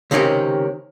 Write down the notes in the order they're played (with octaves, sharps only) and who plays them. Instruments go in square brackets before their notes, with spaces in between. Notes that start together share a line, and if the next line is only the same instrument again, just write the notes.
[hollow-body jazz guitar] C#2 C3 D#3 C4 C#4 G4